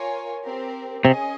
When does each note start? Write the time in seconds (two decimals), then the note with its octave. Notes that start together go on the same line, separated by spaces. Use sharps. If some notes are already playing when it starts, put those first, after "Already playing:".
Already playing: F4 A#4 C#5 G#5
0.43 C4 G4 A#4
1.05 C3 C#4 G#4 D#5 G#5